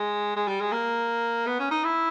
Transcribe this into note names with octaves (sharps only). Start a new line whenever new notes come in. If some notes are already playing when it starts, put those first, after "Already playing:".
Already playing: G#3
G#3
G3
G#3
A#3
B3
C#4
D#4
E4